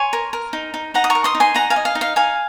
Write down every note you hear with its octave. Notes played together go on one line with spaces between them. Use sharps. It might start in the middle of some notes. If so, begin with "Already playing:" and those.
Already playing: C#5 G#5 C6
A#4
A#4
D#4
D#4
D#4 F#5 A#5
D#6
A#5 C#6
A#4
C6 D#6
D#4
G#5 C6
D#4 F#5 A#5
F5 G#5
D#5
F5
D#4
F5
D#4 F5 G#5